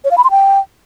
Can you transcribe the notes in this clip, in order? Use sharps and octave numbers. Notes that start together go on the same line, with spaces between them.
C#5
F5
B5
C6
G5